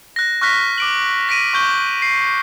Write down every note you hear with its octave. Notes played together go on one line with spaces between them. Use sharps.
F#6 A#6
C#6 F6 F#6 A#6 B6
D6 D7 F#7
A#6 B6 D7 D#7
C#6 G6 G7
C7